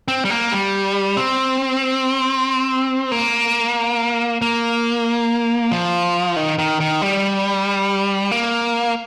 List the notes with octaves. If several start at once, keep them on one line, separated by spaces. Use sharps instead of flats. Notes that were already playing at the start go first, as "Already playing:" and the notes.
C4
G3
A#3
G3
C4
A#3
A#3
F3
D#3
D#3
D#3
G3
A#3